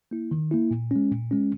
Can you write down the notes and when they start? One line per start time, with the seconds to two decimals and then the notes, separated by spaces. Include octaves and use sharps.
0.11 A#3 E4
0.31 D#3
0.51 A#3 E4
0.71 A#2
0.91 G#3 C#4
1.11 A#2
1.31 G#3 C#4